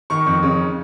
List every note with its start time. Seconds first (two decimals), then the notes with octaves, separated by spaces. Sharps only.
0.10 D#3 C#6
0.26 F2
0.43 C#3